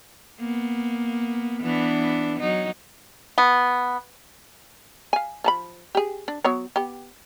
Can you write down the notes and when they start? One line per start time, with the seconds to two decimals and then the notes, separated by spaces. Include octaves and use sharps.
0.40 A#3 B3
1.61 E3 B3 D4
2.40 F#3 D#4
3.38 B3
5.13 F5 G#5
5.44 F3 A5 B5
5.95 G4 G#4
6.28 D4
6.44 F#3 B3 C#5
6.76 B3 G4